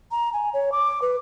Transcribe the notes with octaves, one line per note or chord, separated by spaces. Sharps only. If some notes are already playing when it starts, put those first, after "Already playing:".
A#5
G#5
C#5
D6
B4